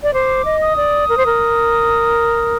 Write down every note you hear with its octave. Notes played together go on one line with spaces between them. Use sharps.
D5
C5 D6
D#5
D#6
D5
A#4
C5
A#4